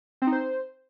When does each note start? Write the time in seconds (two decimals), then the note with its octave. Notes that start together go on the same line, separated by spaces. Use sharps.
0.22 C4
0.27 D#4
0.32 C5